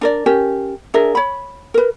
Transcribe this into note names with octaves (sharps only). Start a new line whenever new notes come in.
D4 A#4 D5
C#4 G4 A#4
D4 G#4 A#4 E5
C#5 B5
A#4 B4